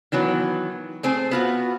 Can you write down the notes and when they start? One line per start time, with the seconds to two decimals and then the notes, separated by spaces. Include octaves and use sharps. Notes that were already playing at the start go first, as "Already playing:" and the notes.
0.12 D#3 E3 F#3 B3
1.03 A3 C4 G#4 C5
1.31 B3 F4 F#4